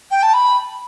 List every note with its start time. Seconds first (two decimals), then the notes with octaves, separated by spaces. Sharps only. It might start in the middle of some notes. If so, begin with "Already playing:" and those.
0.10 G5
0.22 A5
0.33 B5